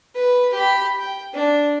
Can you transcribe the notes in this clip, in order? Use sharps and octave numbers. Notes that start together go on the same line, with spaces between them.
B4
G4 B5
G5
D4